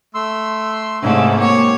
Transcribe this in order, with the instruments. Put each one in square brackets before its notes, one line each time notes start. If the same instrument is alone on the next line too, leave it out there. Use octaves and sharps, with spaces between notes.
[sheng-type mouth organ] A3 C6 E6
[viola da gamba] G#2 C3 A3 [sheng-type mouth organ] C#4 E4
[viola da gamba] A#3 C#5 [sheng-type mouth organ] G4